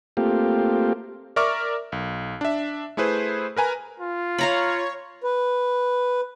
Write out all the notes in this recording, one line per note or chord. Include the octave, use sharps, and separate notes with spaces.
A3 A#3 C4 F4 G4
A#4 D5 E5 C#6 D6 F6
B1
D4 E5
A3 E4 G#4 B4 C5
A#4 B4 G#5 A#5
F4
C#5 F5 A#5 B5
B4